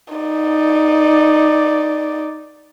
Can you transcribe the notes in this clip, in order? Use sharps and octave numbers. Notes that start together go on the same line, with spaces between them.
D#4 D5